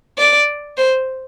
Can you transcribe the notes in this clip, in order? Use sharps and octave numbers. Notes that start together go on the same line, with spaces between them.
D5
C5